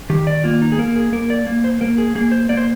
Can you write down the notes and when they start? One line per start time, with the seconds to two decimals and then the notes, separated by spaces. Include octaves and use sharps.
0.10 D#3 G4
0.27 D5
0.44 A#3 F4
0.62 D#4
0.72 G#4
0.78 A#3 A#4
0.96 G#4
1.13 A#3 A#4
1.30 D5
1.47 A#3
1.64 C5
1.81 A#3 A#4
1.98 G#4
2.15 A#3 G#4
2.32 C5
2.49 A#3 D5
2.57 C5